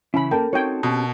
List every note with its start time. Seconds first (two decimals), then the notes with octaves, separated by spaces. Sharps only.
0.14 C#3 E3 C#4 E4 B5
0.31 A#3 A4 A#4 G5 A5
0.53 C4 D#4 F#4 C#5 G5
0.83 B2 C4 C#4 G4